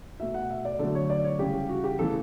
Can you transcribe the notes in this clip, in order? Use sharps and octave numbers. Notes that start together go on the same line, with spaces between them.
B2 A3 E5
F#5
E5
D5
D3 F#3 A3 A4
C#5
D5
C#5
C#3 E3 G3 G4
F#4
G4
C#3 E3 A3 A4